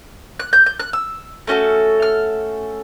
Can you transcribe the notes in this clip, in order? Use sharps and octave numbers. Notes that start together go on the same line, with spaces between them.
F#6
G6
G6
F#6
E6
A3 C#4 F#4 A4
F6